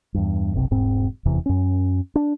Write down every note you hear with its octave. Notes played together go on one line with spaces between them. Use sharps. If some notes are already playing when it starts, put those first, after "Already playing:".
E2 G2
F#1 B1 C3
E1 G#2 C4
F1 E2 C3 E3
F#2 C#4
D4